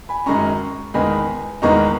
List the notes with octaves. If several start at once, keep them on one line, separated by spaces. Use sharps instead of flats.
G#5 B5
F#2 D#3 G#3 C#4 A#5 C#6
E2 D#3 G#3 B3 D#4 G#5 B5
E2 D#3 G#3 B3 D#4 A#5 C#6